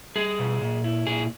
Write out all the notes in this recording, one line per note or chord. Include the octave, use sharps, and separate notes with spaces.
G3 G#4
B2
A#2
E4
A#2 G#4